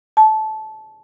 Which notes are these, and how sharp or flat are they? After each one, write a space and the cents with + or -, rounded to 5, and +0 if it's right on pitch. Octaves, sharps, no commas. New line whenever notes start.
A5 -15